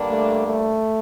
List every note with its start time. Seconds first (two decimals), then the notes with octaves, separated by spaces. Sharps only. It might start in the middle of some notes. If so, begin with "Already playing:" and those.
Already playing: G2 D3 G3 A#3 D4
0.10 A3
0.46 A3